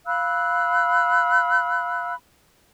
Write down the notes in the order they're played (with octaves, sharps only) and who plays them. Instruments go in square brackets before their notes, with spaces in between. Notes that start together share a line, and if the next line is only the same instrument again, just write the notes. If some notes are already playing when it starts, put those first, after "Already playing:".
[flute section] F5 B5 E6 F#6